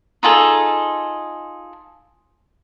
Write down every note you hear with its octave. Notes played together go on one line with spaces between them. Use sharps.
D#4 F4 G#4 A4